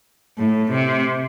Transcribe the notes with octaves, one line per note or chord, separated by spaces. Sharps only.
A2
C3